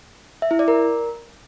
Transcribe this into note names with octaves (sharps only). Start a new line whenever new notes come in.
E5
E4
D5
A#4